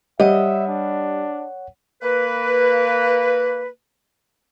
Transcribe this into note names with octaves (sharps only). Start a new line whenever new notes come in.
G3 C#5 D#5 E5 F#5
D4
A#3 B4